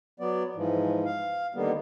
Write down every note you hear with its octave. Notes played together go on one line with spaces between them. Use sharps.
F#3 B3 D5
G#2 E3 F3
F5
D3 D#3 G3 A#3 B3